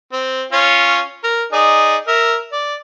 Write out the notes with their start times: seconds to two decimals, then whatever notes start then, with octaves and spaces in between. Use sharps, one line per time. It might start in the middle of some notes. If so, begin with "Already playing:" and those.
0.13 C4
0.52 C#4 F4 C#5
1.24 A#4
1.53 D#4 G#4 D5
2.07 A#4 E5
2.52 D5